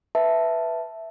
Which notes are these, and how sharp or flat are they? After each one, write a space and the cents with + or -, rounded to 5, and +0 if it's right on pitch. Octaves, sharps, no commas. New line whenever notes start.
B4 +0 E5 +0 A5 +0